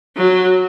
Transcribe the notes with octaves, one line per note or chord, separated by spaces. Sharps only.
F#3